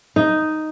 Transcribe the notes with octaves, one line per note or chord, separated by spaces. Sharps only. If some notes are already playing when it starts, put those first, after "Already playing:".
D#4